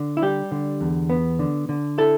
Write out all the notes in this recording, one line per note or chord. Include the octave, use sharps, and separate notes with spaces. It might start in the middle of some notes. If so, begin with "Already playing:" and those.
Already playing: D3
E4
G3 G4
D3
E2
B3
D3
D3
E4 A4